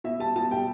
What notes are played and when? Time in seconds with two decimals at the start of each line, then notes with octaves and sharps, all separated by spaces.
0.04 B2 E5
0.20 G3 A5
0.36 B2 A5
0.51 G3 G5